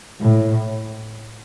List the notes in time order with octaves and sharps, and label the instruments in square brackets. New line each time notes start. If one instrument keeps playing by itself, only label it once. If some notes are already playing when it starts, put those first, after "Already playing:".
[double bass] A2